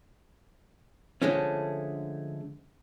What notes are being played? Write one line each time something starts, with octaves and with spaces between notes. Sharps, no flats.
D3 F3 G#3 A3 C#4